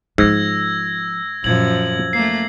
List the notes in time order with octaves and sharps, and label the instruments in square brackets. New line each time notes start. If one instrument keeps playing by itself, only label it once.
[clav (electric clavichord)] G#2 [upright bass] F3 F4 [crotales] E6 G#6 A#6
[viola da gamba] F#2 F3 [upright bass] A#2 [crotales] G#6 F#7
[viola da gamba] A3 A#3 [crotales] C7